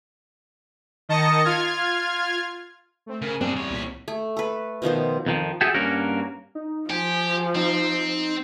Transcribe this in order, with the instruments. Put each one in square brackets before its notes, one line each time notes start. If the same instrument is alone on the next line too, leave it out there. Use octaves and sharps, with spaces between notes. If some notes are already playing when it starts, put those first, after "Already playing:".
[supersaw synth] D#3 D#5 A5 A#6 C#7
F4 F6 G#6
[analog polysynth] A3 C4
[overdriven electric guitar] C#3 [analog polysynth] A#4 F5 G#5
[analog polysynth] G3 F#5 [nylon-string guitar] C4 [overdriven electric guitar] D4 G#4
[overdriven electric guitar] E2 C#5
[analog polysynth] C2 A#2 B6
[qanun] A3
A4 B4
B2 D#3 F3 C5
[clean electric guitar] F2 D#3 F3
F#4 G#4 A4 E5 G5 G#5
G2 A#3 C#4 F#4 A#4
[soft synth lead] D#4
[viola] F3 [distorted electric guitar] G4 [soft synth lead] G#5
[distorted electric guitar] C4 [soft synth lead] D#4